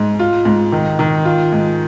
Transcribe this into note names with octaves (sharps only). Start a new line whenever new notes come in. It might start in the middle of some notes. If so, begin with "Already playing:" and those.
Already playing: G#2
F4
G#2
D#3
D#3
F4
G#2